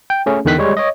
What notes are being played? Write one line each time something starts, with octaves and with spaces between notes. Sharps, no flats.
G5
A3 C#4 G#4
E2 D3 D#3 F#6 B6
G3 G#3 C#5
C#5 D#5